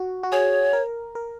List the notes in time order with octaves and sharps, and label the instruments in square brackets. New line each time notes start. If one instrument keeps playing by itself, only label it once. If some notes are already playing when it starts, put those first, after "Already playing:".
Already playing: [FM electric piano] F#4
F#4
[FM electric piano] G#4 [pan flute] C#5
[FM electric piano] A#4
A#4